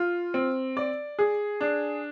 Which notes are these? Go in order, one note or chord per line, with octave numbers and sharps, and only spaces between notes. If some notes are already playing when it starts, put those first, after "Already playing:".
Already playing: F4
C4
D5
G#4
D4